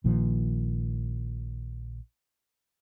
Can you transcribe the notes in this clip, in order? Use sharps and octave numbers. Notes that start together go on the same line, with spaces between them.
A#1 A#2 D#3 F3